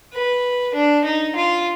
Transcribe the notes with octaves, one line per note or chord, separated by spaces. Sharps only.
B4
D4
D#4
F4